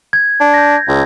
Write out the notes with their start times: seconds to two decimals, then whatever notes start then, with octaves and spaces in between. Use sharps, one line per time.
0.13 G#6
0.40 D4
0.54 G6 A#6
0.88 C#2